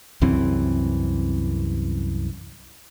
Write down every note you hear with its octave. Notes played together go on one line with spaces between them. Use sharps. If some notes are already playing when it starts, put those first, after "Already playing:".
C2 F#2 E3 C4